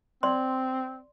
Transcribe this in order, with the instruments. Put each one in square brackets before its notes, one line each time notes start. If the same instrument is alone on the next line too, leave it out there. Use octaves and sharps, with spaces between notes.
[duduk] C4 [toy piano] D5 C6